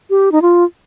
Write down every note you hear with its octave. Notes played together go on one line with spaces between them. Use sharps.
G4
D#4
F4